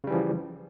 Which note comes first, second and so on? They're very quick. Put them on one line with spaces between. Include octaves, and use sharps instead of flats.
C#3 G3 E3 F3